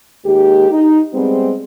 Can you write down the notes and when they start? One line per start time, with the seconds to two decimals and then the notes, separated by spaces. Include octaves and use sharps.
0.24 D#2 G#3 G4
0.71 D#4
1.13 G3 G#3 B3 C4